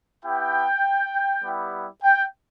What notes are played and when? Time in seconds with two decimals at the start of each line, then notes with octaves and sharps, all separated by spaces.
0.23 B3 E4 G4 G5
1.43 G3 B3 E4 G4
2.03 G5